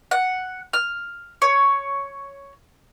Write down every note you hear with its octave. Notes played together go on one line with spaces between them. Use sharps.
F#5
F6
C#5